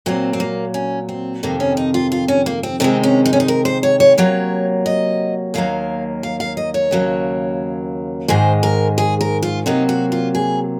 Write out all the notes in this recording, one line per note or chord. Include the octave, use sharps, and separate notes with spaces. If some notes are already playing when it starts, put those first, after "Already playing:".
A#2 F#3 A#3 C4
C4
A#3
C#4
C4
F2 C3 D#3 A#3
C#4
D#4
F4
F4
C#4
A#3
C4
C3 D#3 G#3 C4
C#4
D#4
C#4
D#4
A#4
C5
C#5
C#5
C3 F#3 A#3 C#5
D#5
D#2 D#3 F#3 A#3 F5
F5
F5
D#5
C#5
D#2 C#3 F#3 A#3
G#2 D#3 G#3 C5
A#4
G#4
A#4
F4
C3 F#3 A#3 D#4
F#4
F4
G#4